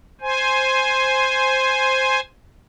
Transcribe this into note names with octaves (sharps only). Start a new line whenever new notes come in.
C5 G#5